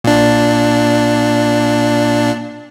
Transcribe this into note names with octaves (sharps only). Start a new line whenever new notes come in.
A#2 D4